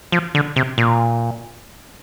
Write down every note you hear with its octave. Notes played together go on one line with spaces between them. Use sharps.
F3
D3
C3
A#2